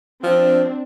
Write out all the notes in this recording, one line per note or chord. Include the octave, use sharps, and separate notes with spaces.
F3 C4 D4